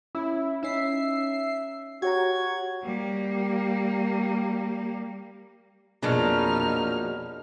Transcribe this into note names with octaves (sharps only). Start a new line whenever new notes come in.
C#4 E4
C#4 D#4 E5 C7
F#4 G4 C#5 A#5 G#6
G3 A#3
A#1 F2 B2 F#3 G#3 D4 D#4 F6